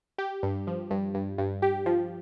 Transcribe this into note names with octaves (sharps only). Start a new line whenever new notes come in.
G4
G2
F3
G2
G2
G2
G4
F3